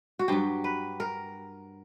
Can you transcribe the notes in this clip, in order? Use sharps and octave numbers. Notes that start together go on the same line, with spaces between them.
F#4
G2 F#3 G4
B4
A#4